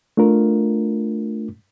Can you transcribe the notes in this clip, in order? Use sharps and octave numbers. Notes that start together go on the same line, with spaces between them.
A3 D4 F4 A#4